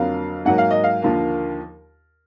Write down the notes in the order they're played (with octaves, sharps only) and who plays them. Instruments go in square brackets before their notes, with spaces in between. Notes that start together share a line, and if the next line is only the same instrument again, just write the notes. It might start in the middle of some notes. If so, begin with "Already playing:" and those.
Already playing: [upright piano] F2 D3 F#3 A#3 F5
G#2 F#3 A#3 F#5
F5
D#5
F5
D#2 D3 F3 A#3